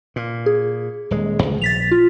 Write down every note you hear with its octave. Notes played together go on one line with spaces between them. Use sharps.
A#2
G#4
D#1 G#3
C#2
A#1 A6 B6 F7
F4